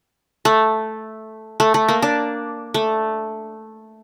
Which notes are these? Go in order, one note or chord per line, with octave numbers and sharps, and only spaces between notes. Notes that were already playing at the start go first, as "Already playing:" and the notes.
A3
A3
A3
A#3
D4
A3